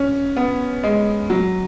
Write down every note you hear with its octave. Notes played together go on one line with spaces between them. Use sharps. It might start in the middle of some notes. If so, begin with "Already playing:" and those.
Already playing: C#4
B3
G#3
F#3